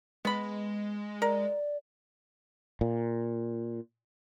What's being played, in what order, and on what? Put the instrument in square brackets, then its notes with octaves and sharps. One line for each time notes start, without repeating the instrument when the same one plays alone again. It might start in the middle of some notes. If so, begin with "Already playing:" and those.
[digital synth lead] G#3 [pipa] B3 B5
[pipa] A#4 [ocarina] D5
[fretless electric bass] A#2